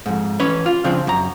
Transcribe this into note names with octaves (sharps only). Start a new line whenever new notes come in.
F2 G#2
E3 C#4 B4 C#5
F4
C#3 F3 C4 D4
F#2 A#5